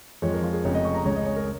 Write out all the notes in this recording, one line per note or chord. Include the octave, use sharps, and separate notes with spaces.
F2 F3 G#3 C#5
A#4
F4
G#4
F1 F2 C#3 G#3 C#5
D#5
C#6
A#5
C#2 C#3 G#3 C#5
D#5
C#5
A#4